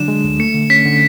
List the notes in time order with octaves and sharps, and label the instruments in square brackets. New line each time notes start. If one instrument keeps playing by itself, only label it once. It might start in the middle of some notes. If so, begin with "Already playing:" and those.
Already playing: [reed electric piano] D3 F#3 D4 [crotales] E7
[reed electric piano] G#3
D2
[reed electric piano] A3 [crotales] C#7
[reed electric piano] D3
[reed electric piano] C#4 [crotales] B6
[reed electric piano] D3